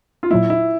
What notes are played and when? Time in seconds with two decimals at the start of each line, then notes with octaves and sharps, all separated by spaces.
0.23 F4
0.31 A#2 F#3 A#3 E4
0.50 E4